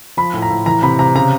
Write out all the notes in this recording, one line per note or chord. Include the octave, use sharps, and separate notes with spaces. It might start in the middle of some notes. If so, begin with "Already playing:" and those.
F3 B5
A2
A#5
A2
E3 A#5
C3 B5
C3 A#5
C#3 A#5